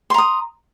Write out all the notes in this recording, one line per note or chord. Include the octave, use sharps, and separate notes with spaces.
A#5 C6 D#6